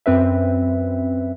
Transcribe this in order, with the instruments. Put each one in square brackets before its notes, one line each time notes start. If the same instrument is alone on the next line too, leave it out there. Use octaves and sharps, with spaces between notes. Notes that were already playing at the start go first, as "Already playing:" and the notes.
[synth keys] F#2 C4 B4 E5